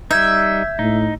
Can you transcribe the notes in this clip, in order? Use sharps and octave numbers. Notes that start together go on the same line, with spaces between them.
G3 D#4 E5 G6 G#6
A2 D#4